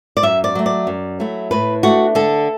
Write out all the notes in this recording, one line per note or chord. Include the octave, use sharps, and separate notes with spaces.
D5
F#2 E5
D5
F#3 A3
D5
F#2
F#3 A3 E4
A2 B4
A3 D4 F#4
D3 A4